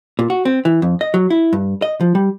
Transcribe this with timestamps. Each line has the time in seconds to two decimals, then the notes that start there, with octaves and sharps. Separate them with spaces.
0.19 A#2
0.30 F#4
0.45 C4
0.65 E3
0.82 F2
1.01 D#5
1.14 F#3
1.30 E4
1.53 G2
1.82 D#5
2.01 F3
2.15 G3